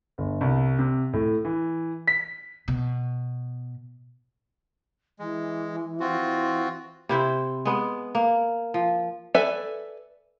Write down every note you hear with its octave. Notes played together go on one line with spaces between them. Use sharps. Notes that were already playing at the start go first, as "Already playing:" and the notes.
G1
C2
C3
A2
E3
B6
B2
E3 G#3
C4 F4 F#4
E3
C3 E4 C5 E5
G#3 B3
A#3
F3
A4 B4 D5 E5 G#5